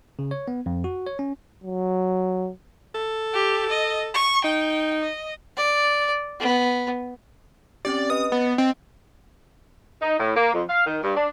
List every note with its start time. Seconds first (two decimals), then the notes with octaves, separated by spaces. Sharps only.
0.19 C#3
0.31 C#5
0.48 B3
0.66 F2
0.84 F#4
1.07 C#5
1.19 C#4
1.64 F#3
2.95 A4
3.34 G4
3.70 D#5
4.14 C#6
4.44 D#4 G5
5.02 D#5
5.57 D5
6.40 B3
7.85 C4 C#4 G4 D5
8.10 B4 D#5 D#6
8.32 B3 A6
8.58 C4 D#5
10.01 D#4
10.20 A2
10.36 A#3
10.54 F2
10.69 F5
10.86 D#3
11.03 G2
11.16 D4